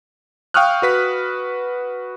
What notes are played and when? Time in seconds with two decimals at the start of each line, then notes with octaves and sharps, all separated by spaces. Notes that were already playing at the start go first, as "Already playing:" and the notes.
0.54 F5 G5 C#6 D#6 F6 F#6
0.82 F#4 B4 B6